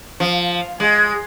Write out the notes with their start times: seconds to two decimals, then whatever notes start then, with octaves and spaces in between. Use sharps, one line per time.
0.20 F3
0.80 G#3